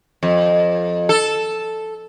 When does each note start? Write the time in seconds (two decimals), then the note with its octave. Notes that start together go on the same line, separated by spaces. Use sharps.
0.23 F2
1.09 A4